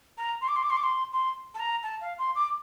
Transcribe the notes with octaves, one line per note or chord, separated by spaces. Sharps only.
A#5
C6
D6
C6
D6
C6
D6
C6
C6
A5
A#5
A5
F5
C6
D6